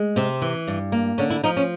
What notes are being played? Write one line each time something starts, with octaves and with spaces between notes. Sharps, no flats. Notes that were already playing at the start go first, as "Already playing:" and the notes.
Already playing: G#3
C3 C4
E3
G2
A#3
D3 C#4
E4
F3 D#4
C#4